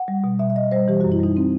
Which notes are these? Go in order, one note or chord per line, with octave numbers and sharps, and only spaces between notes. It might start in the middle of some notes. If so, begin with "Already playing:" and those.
Already playing: F#5
G3
B2
B2 E5
E5
G3 D#5
G3 C5
E3 G4
F#4
F#2
E4
G3 D#4
C4